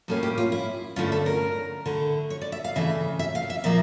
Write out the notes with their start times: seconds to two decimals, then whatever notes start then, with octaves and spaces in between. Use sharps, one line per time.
0.08 A2 G3 A#3 C#4 A4
0.23 G4
0.38 F4
0.52 E4
0.96 G2 D3 A3 C#4 E4 F4
1.12 A4
1.26 A#4
1.86 D3 A3 E4
2.30 C#5
2.41 D5
2.52 E5
2.64 F5
2.76 C#3 E3 A3 E5
3.19 E5
3.35 F5
3.50 E5
3.64 A#2 F3 A#3 E5